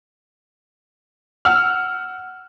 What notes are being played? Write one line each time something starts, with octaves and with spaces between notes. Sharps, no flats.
F#5 E6 F6